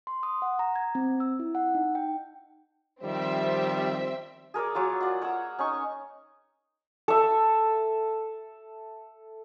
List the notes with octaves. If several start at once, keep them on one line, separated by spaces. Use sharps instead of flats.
C6
D#6
F#5
A#5
G#6
C4
E6
E4
F#5
D#4
G5
D#3 F3 G3 C4 E5
G#4 A#4 C#5 D5
F#3 A#3 F4
F4 D5 F#5
C#5 F#5 A#5 E6
C#4 D#4 C#6
A4 E5